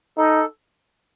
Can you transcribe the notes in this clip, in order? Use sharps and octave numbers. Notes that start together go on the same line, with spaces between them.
D#4 A4